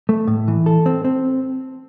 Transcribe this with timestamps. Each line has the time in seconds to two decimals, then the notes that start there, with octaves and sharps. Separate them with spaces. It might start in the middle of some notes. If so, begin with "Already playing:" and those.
0.09 A3
0.28 A2
0.48 E3
0.66 A4
0.86 C4
1.04 C4